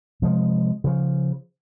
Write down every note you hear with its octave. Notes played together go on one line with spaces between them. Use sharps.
C3 F3 G#3
C#3 F3